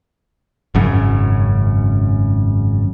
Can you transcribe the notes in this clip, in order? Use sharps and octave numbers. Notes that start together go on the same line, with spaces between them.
G#1 F#2 C#3